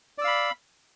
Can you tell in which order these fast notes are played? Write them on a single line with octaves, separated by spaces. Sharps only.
D5 E6 F5 B5